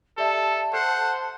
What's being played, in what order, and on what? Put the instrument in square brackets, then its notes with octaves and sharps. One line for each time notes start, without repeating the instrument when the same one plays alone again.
[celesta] G4 D5 E5 [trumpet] A4 [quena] A5
[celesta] A4 F6 C7 [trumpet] C5 [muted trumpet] F#5